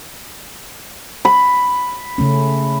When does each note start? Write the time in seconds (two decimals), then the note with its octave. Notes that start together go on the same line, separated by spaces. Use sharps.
1.25 B5
2.18 C#3 A3 C#4